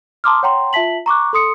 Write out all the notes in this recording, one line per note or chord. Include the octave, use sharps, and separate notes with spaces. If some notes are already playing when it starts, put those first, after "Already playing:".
A5 A#5 C6 D6 D#6 F6
C#5 F#5 G5 A#5 C6
F4 E5 A5 B6 F#7
A#5 C#6 D6 F#6
A4 C6 D#6 C#7